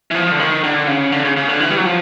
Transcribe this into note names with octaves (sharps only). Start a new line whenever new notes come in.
E3
F3
D3
D#3
D3
C#3
D3
C#3
C#3
D3
E3
G3
F#3
F3